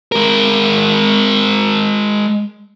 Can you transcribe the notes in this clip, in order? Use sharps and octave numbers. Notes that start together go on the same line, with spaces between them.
G#3 A#4